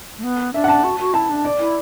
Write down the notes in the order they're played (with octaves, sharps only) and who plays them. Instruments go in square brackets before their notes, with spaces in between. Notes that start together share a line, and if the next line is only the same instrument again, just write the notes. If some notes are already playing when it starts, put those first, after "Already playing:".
[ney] A3
B3
[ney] D4 [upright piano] E5
[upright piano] F#5
A5
[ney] F#4
F#4
[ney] E4 [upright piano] A5
[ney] D4
[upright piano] D5
[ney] E4